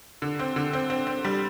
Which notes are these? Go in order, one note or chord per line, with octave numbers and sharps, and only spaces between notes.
D3
C4
D3
C4
C4
C4
G3